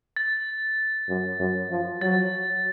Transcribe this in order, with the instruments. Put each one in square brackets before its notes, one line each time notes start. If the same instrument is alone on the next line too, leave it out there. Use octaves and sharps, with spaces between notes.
[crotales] A6
[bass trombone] F#2
F#2
F3
[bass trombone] F#3 [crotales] A6